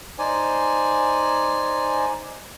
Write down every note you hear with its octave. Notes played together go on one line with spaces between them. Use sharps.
D#4 C5 D5 G#5